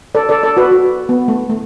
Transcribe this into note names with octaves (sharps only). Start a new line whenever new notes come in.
A4 D5
A4 D5
A4 D5
F#4 B4
F#4
B3
A3
A3